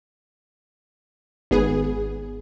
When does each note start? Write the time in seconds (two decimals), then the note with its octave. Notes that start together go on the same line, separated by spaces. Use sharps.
1.51 G#1 B3 G#4